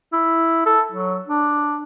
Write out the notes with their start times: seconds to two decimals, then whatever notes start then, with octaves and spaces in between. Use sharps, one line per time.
0.13 E4
0.66 A4
0.92 F#3
1.28 D4